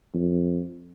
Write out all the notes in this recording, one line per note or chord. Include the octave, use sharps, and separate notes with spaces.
F2